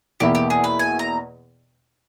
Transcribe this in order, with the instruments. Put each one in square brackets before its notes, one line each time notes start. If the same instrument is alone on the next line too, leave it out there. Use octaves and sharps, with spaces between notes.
[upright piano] E2 B2 A#3 E4 [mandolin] G4
[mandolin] G4
G#4
B4
G#5
A#5